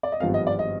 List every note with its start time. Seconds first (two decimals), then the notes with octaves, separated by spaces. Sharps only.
0.03 D5
0.12 D#5
0.20 G#1 G2 F3 B3 F5
0.34 D#5
0.47 D5
0.59 D#5